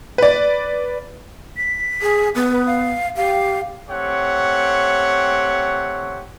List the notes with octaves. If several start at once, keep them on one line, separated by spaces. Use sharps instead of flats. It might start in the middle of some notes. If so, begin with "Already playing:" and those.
B4 D5
B6
G#4
B3
B4
F5
G4 F5
A3 C4 G4 C#5 F#5